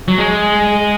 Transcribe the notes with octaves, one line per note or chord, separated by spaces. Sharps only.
F#3
G#3